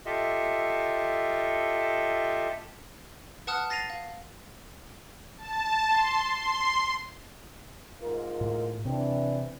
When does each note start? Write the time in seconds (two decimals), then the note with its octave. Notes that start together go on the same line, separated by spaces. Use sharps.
0.06 F4 G4 A4 D#5 E5
3.47 B4 F#5 A5 D#6 F6 F#6
3.70 A6 A#6 C7 D#7 F7
3.90 F5
5.37 A5
5.87 C6
6.35 C6
8.00 G#2 F4 A#4
8.41 A2
8.85 C3 E3 C4 D4